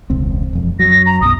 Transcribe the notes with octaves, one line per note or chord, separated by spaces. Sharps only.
E1 C#2 C4
E1 F2
F#2 F#3 A#6
A#5
B1 F#2 B2 D#6